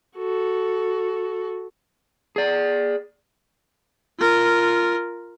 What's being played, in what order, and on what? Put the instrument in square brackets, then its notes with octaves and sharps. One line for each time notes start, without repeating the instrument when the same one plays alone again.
[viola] F#4 A4
[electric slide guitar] G#4 D5
[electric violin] F4 A#4